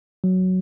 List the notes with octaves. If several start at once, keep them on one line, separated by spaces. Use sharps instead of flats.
F#3